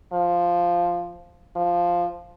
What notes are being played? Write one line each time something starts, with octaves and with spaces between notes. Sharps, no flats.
F3
F3